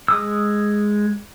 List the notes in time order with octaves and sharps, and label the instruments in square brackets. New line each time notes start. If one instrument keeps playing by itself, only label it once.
[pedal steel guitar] G#3 D#6 E6